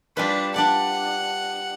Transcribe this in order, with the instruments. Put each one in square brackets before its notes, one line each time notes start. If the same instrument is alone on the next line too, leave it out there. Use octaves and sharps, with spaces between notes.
[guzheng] G3 F4 B4 [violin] D4
[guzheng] D4 D5 [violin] F#5